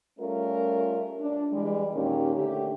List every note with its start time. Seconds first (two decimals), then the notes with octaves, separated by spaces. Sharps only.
0.19 G3 A3 C#4 F4 A#4
1.19 D4
1.52 E3 G3 G#3
1.92 D#2 A#2 D#3 C#4 G4
2.34 D3 A3 G4